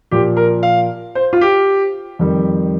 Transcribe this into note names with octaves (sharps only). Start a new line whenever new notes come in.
A#2 F3 G4
A#4
F5
C5
F4
G4
F2 D#3 G3